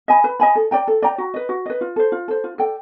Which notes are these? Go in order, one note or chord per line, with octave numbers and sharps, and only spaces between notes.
D#5 G#5 B5
B4
D#5 G#5 B5
A4
D5 G5 A#5
A4
D5 G5 A#5
F#4
B4 D#5
F#4
B4 D#5
F4
A4 C5
F4
A4 C5
F4
A4 D5 G5